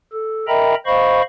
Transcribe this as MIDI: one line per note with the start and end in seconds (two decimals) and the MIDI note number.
0.13 0.46 69
0.48 0.75 70
0.48 0.75 75
0.48 0.75 76
0.48 0.75 79
0.48 0.75 82
0.48 0.75 83
0.86 1.22 72
0.86 1.22 75
0.86 1.22 77
0.86 1.22 83
0.86 1.22 85